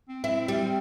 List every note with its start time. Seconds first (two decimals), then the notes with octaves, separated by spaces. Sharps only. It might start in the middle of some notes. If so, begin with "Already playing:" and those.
0.09 C4
0.24 C4 E4
0.48 G3